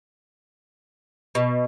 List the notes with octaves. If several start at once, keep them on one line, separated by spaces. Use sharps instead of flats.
B2